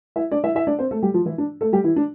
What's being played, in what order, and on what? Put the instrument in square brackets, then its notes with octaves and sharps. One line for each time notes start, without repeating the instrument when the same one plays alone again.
[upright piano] E4 E5
D4 D5
E4 E5
E4 E5
D4 D5
C4 C5
A3 A4
G3 G4
F3 F4
E3 E4
D4
A3 A4
G3 G4
E3 E4
D4